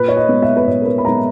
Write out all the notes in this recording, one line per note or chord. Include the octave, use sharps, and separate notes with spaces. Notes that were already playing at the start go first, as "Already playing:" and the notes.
Already playing: A#2 B4
C#5
D#5
G#3 B3
E5
B4
A#2 C#5
A#4
B4
B5
G#3 B3 A#5